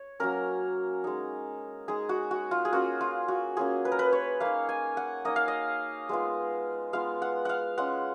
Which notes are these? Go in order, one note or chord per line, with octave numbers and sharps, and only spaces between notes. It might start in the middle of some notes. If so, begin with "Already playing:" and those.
Already playing: C#5
F#3 A#3 C#4 A#4
G#3 D#4
G#3 D#4 G#4
F#4
F#4
F4
G#4
A#3 C#4 F4 F#4
F4
F#4
A#3 C#4 F4 G#4
B4
A#4
B4
C#5
A#3 D#4 F5
G#5
F#5
A#3 D#4 D#5
F5
D#5
G#3 B3 F4
G#3 B3 F4 F5
F#5
F5 F#5
G#3 C#4 F4 F#5